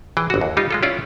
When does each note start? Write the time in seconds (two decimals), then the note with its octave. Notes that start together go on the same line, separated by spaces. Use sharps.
0.17 E3 G#4 G5
0.30 G1 F#4
0.41 D#2
0.57 G3 D#4 F4 G4
0.71 G#3 F4 A4
0.83 C#4 E4 F4 D5